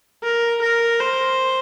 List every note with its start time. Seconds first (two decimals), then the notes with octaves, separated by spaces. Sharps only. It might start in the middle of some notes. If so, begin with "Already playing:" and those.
0.23 A#4
0.61 A#4
1.00 C5